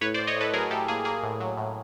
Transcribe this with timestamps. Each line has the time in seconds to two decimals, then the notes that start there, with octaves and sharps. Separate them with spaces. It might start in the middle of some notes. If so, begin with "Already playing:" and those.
0.01 A2 B4 C#5
0.14 C5 D5
0.19 A2
0.27 C#5 D#5
0.36 A2 A4 B4
0.53 F#3 G#4 A#4
0.71 A2 G4 A4
0.88 A#3 G#4
1.05 A#3 G#4
1.23 A2
1.40 F#3
1.57 A2